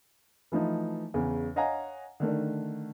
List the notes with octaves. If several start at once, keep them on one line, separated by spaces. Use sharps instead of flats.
E3 F3 A3 D#4
E2 C#3
C#5 D#5 F5 F#5 G#5 A#5
D3 D#3 A3 D4